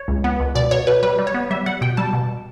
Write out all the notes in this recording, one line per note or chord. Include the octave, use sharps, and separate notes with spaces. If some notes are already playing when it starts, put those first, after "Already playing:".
Already playing: C#5
C#2
B3
C#2
B2 D5
B2 C#5
B2 B4
G3 B4
G3
C#5
B3
G3 E5
G3 F#5
B2 G5
G3 A5
B2